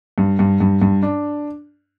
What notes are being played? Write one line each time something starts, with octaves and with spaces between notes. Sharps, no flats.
G2
G2
G2
G2
D4